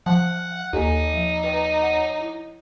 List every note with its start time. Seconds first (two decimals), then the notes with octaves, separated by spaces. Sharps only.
0.06 F3 F#5
0.73 D#2 D#4 A4 G#5 A#5
1.13 F3
1.44 B4 D#5 G5
1.82 C#5 F#5
2.21 E4